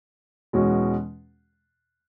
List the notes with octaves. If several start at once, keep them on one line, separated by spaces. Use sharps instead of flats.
E2 B2 G#3 C#4 F#4